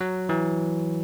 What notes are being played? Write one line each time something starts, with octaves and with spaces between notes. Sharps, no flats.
F#3
E3